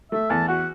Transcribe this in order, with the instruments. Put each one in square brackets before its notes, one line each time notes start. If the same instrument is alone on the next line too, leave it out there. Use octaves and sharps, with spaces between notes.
[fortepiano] A3 [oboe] E5
[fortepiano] E2 [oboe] A5
[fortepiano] F#4 [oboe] F#5